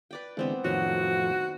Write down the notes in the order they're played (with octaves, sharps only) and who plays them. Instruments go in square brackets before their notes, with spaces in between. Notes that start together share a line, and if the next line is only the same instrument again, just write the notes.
[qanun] B4 D5 G5
[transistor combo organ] D3 E3 G#3 [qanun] B3 C4 F#5
[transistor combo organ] F2 A2 F3 [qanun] D#3 F#3 [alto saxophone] F#4